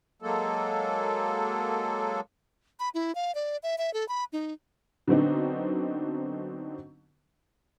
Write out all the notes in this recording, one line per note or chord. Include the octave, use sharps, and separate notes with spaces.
F#3 G#3 A#3 A4
B5
E4
F5
D5
E5
E5
A4
B5
D#4
D3 F#3 B3 C4 D4 D#4